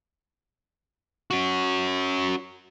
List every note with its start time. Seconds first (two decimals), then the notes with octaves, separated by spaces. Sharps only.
1.31 C#4 F#4